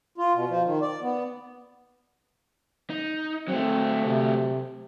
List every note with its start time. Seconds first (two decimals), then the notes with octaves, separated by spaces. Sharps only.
0.18 F4
0.34 B2
0.49 F3
0.65 D#3
0.81 D5
1.02 B3
2.90 D#4
3.48 F#3 A3 C4
4.05 C3